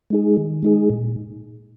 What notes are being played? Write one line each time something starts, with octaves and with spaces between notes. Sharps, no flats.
G#3 D#4 G#4
D#3
G#3 D#4 G#4
A#2